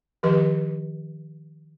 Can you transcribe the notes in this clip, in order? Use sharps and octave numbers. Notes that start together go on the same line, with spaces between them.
D#3 F3 G4 B4 D#5